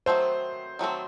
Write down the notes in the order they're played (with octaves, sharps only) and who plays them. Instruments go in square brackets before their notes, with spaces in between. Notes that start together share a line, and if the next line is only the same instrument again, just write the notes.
[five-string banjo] D#3 F#3 A3 C4 [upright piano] C5
[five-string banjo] D#3 F#3 A3 C4